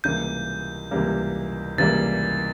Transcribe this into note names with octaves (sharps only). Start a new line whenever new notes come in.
C#2 C3 E3 G3 A#3 G6
C#2 C3 E3 G3 A#3
C#2 C3 E3 G3 A#3 A6